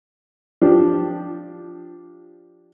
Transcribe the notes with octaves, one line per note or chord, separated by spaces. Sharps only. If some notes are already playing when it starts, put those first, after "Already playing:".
F3 D4 G4